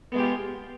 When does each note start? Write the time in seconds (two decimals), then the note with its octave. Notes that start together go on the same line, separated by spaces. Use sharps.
0.12 B3
0.15 G#3
0.18 G4
0.21 F4